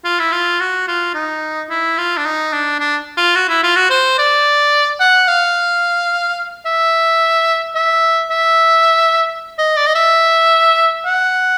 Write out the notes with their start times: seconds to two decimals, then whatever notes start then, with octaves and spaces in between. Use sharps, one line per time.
0.05 F4
0.19 E4
0.32 F4
0.60 F#4
0.88 F4
1.15 D#4
1.70 E4
1.98 F4
2.17 D4
2.25 D#4
2.53 D4
2.80 D4
3.17 F4
3.35 F#4
3.49 E4
3.63 F4
3.76 F#4
3.90 C5
4.18 D5
5.00 F#5
5.28 F5
6.66 E5
7.75 E5
8.31 E5
9.59 D#5
9.77 D5
9.87 D#5
9.95 E5
11.06 F#5